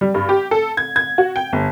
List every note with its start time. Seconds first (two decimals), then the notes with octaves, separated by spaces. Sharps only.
0.01 G3
0.14 G2
0.29 G4
0.51 A4
0.77 G#6
0.96 G#6
1.18 F#4
1.36 G5
1.53 G1